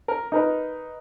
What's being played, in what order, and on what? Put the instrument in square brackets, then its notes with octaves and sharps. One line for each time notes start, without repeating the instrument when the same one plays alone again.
[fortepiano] A#4
D#4 A#4 B4